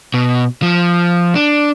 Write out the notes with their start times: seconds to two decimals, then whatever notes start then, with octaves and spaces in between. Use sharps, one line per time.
0.14 B2
0.62 F3
1.35 D4